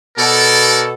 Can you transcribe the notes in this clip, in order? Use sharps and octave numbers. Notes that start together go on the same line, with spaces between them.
B2 A4 A#4 C#5 D5